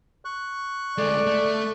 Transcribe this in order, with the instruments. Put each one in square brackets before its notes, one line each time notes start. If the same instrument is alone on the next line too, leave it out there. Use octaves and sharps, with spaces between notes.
[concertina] C#6 F#6
[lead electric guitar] D2 G#3 [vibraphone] A4 [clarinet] D5
[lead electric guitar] A3